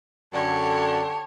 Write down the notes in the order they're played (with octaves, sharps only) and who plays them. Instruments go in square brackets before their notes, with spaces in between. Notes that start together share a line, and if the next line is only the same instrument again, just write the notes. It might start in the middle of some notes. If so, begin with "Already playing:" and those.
[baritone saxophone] F#2 [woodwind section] D3 [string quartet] G4 C#5 [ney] A5